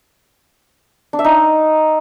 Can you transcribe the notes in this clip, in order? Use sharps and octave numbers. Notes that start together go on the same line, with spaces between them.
D4
E5
D#4